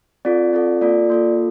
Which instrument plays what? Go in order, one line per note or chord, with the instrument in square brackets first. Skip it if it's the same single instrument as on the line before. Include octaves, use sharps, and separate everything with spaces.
[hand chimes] C4 F4 A4 D5
C4 F4 A4
A#3 F4 A4 D5
A#3 F4 A4